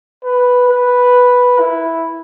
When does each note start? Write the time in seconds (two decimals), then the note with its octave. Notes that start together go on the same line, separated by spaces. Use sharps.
0.24 B4
0.69 B4
1.59 E4